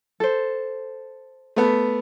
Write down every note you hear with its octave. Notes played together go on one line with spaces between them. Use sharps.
A4 C5
A3 B3